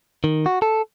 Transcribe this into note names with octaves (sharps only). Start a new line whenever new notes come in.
D#3
F#4
A4